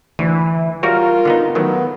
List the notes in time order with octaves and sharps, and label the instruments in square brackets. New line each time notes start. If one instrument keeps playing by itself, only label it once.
[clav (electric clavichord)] D2 [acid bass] E3
[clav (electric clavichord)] G3 F#4 C#5 [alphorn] F4 [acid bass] A#4
[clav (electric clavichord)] D3 B3 D#4
[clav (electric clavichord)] D#3 F#3 A3 [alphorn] B3